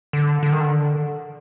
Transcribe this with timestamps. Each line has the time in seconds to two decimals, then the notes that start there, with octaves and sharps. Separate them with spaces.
0.13 D3
0.43 D3
0.52 D#3
0.60 D3